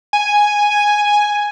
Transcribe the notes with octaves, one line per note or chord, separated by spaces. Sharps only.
G#5